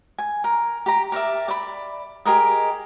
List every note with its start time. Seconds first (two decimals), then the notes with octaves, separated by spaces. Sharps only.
0.19 G#5
0.44 A#4
0.86 G4 A#5
1.12 G4 A#4 D5 E5
1.48 D5 B5
2.26 G4 G#4 A#4 D#5